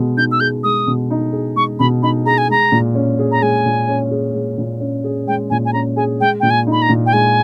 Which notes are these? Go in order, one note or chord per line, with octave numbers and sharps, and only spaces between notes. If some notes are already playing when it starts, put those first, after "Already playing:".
Already playing: B2 G#3
D#4 G6
E6
G#4 G6
G#3 D#6
B2
D#4
G#4
G#3 C#6
B2 B5
D#4 B5
G#4 A#5
G#5
G#3 A#5
A#2
C#4
G#4
A#5
G#3 G#5
A#2
C#4
G#4
G#3
A#2
C#4
G#4
G#3 G5
A#2 G#5
G#5
C#4 A#5
G#4 G#5
G#3 G5
A#2 G5
G#5
D#4
B5
A#5
A#2
G5
G#3 G#5